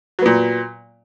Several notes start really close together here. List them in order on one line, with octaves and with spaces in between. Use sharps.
F#3 B3 A#2